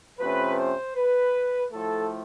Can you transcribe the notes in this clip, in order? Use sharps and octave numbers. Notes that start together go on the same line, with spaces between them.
C3 F3 A3 C#4 B4
C5
B4
A2 F3 A3 A4